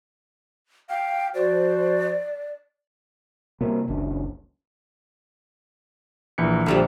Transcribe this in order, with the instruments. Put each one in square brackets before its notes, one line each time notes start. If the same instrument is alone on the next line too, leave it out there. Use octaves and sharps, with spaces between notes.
[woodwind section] F5 [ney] G5
[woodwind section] F3 F#4 C5 [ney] D5
[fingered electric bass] C3 G3 A#3
F#1 C#2 D4
[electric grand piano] A#1 E3 C#7
[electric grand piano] A#1 [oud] D3 F3 G3